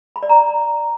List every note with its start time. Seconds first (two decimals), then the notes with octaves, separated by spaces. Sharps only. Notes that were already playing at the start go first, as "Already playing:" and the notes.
0.16 B5
0.23 D5
0.29 A#5